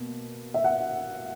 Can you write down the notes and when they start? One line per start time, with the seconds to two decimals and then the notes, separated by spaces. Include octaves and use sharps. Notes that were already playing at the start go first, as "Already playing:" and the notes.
Already playing: B2 A#3
0.54 E5
0.64 F#5